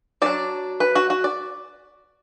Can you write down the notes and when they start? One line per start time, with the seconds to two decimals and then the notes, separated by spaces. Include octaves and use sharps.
0.22 F#3 D4 D5
0.80 B4
0.95 F#4
1.10 F#4
1.24 D5